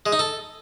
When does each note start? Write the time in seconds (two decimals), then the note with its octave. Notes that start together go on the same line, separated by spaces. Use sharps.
0.06 G#3
0.12 D#4
0.19 A4